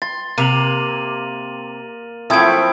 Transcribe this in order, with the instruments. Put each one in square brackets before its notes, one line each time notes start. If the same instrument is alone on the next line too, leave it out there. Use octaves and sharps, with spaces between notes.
[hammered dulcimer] C6 [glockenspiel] A6
[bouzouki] C3 [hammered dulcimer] A#3 [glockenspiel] D#7 F7 F#7
[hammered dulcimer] F3 C4 E4 [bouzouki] F#3 A3 [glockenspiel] D#6 G#6 D7